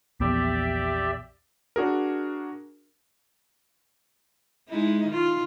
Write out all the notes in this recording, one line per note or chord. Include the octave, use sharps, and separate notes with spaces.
A#1 E2 B3 G4 D5 E5
D4 F#4 G#4 A#4
G#3 D#4 E4
D#3 F4